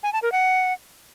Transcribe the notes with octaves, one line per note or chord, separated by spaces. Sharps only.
G#5
A5
A#4
F#5